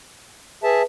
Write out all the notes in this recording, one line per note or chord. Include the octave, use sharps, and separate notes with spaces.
G#4 B4 E5 A5